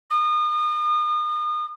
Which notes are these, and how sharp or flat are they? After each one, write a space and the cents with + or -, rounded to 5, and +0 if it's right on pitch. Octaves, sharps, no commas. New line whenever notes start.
D#6 -35